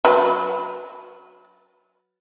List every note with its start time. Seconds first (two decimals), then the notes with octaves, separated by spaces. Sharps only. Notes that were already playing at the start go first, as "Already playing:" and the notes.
0.05 F#3 B4